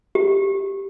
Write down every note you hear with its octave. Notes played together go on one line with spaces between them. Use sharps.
G4